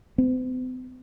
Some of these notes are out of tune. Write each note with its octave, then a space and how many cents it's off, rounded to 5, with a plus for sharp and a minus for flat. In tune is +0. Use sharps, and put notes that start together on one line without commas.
C4 -45